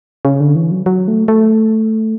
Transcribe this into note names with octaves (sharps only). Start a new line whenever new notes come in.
C#3
D3
E3
F#3
F#3
A3
A3